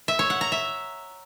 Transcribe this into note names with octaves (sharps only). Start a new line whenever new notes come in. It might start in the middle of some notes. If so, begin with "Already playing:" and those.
E5
C#5
F#5
A#5
E5